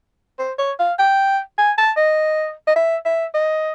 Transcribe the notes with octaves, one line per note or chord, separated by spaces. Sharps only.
C5
C#5
F5
G5
G#5
A5
D#5
D#5
E5
E5
D#5